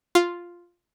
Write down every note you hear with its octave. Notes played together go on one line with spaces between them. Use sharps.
F4